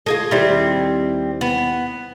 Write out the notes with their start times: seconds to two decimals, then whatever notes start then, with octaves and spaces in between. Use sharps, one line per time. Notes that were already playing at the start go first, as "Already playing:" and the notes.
0.06 F4 G#4 A4 D#5
0.31 D#2 G3 C4 E4
1.41 B3